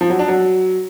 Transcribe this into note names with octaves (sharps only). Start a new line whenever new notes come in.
F3
F#3
D4
F#3